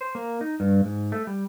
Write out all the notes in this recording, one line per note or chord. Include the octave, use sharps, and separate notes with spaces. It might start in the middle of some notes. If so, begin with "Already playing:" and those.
C5
A#3
D#4
G2
G#2
A3
G3